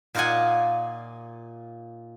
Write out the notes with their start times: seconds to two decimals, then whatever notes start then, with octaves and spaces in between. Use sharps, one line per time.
0.15 A#2 D#4 F4 D5 F#5 G#5